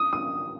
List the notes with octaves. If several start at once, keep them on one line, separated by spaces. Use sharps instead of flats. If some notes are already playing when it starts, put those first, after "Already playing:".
Already playing: D#6
D#6